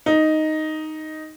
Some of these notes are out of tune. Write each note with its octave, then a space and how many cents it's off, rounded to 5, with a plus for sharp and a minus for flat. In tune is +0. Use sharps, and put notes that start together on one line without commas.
D#4 +0